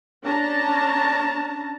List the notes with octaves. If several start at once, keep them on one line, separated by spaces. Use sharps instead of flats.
C#4 D4 A5 A#5